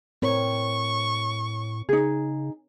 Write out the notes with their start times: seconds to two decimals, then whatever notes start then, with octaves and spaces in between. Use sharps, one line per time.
0.22 A2 C4 A#4 C#5 C#6
1.89 C#3 D#4 G#4